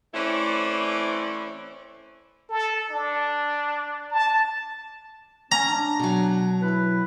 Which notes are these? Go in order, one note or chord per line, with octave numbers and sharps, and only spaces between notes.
E3 A3 C4 C#4 E4 D5
A4
D4
A5
C#4 A#5
D4
B2 F#3
E4 B4